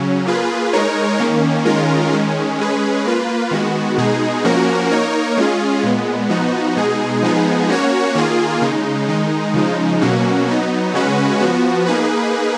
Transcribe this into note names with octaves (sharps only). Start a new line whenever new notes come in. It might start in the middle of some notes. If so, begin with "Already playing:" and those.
Already playing: C#3 F#3 C#4
A#3 F4 G#4 B4
G#3 D#4 A#4 C#5
D#3 A#3 C#4
D#3 G#3 C#4 F4 A#4
D#3 G#3 C#4
G#3 C#4 G#4 B4
A#3 F4 B4
D#3 G#3 B3 F#4
B2 G#3 D#4 G#4
F3 A#3 C#4 F#4 A#4
A#3 D#4 A#4 C#5
G#3 C#4 F4 G#4
A#2 G#3 B3
F3 B3 D#4 F#4
B2 G#3 D#4 G#4
F3 G#3 B3 D#4 G#4
A#3 C#4 F#4 C#5
D#3 A#3 F4 G#4
C#3 G#3 D#4
D#3 G#3 D#4
C#3 F3 G#3 D#4
B2 F#3 A#3 C#4 F#4
F#3 B3 D#4
C#3 G#3 C#4 F#4 B4
F3 B3 F#4
A#3 D#4 G#4 B4